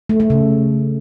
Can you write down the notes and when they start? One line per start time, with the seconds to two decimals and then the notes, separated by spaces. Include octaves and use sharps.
0.09 A3
0.20 A3
0.30 C#3